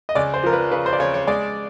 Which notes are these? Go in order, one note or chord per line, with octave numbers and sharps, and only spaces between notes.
D#5
C#2 D5
C5
F3 A#4
B4
C#3 B4
C5
D5
C#3 C#5
C#5
G#3 D5